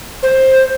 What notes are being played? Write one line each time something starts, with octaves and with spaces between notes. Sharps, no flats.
C5